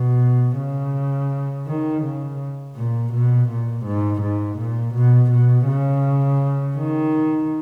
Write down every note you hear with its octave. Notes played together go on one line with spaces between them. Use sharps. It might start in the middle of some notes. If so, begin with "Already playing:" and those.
Already playing: B2
C#3
D#3
C#3
A#2
B2
A#2
G#2
G#2
A#2
B2
B2
C#3
D#3